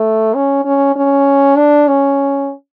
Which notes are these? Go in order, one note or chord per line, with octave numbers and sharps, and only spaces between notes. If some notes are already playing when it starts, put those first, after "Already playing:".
Already playing: A3
C#4
C#4
C#4
D4
C#4